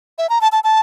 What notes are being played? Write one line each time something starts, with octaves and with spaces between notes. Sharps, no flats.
E5
A#5
A5
A5
A5